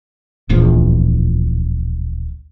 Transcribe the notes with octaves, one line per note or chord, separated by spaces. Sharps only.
D1 A#1 E2 F3